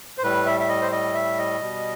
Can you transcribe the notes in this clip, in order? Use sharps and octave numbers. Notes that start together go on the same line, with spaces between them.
C5
A2 G3 B4
E5
E5
D#5
C5
D#5
E5
D#5
B2 G3